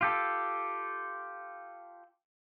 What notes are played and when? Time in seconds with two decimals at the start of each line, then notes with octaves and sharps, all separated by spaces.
0.01 F4 G4 A4